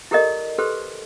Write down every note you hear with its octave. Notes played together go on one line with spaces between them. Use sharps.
E4 G4 A4 A#4 D5 D#5
G4 A4 B4 C5 C6